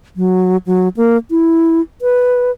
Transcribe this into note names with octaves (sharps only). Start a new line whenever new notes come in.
F#3
F#3
A#3
E4
B4